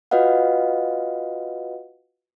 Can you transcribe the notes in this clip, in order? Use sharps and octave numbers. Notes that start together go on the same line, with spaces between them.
F4 F#4 B4 D#5 F5 F#5